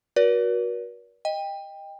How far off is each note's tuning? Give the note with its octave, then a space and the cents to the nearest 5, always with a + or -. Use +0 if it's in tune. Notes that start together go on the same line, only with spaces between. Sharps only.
F#4 -10 A#4 +45 D5 -40
D#5 +0 G5 +20